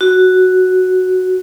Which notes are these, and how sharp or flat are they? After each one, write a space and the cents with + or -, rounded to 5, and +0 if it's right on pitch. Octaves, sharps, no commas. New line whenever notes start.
F#4 +0